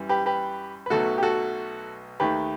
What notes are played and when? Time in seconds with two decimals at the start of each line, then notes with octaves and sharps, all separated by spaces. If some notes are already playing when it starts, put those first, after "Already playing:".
Already playing: F#2 E3 G3
0.09 G4 B4
0.26 G4 B4
0.86 B4
0.90 B1 B2 F#3 A3 F#4 A4
1.18 G4
1.23 F#4 A4
2.20 D#2 D#3 A3 G4 B4